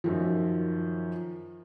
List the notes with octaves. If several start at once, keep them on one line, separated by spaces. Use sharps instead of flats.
F#2 D#3 F3